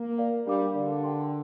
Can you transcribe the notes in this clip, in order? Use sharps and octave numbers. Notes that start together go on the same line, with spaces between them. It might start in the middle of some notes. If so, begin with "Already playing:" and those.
Already playing: A#3
A#4 D5 F5
G3 D4 G4 A#4 F5 D6
D3 G4 A#4 D5
A#4 G5 C6